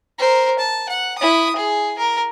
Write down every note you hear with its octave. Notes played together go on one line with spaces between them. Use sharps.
A#4 C5
A5
F#5
E4 D#6
G#4
A#4